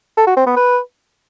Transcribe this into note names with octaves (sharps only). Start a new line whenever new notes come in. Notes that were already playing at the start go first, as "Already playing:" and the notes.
A4
F#4
C4
B3
B4